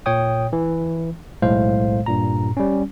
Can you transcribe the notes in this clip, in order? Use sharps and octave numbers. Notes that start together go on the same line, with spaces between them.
A#2 C#5 G5 D#6
E3
B1 A2 G#3 C5 F5
G2 A#2 A#5
G3 C#4